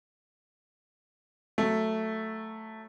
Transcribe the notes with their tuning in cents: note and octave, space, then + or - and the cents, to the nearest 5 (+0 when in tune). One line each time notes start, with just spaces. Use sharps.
F#3 +0 A3 +0